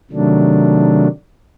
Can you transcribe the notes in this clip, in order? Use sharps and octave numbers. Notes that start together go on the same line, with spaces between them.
C3 D#3 F#3 A3 D4